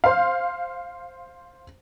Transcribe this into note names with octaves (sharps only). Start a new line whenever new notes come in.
C5 F5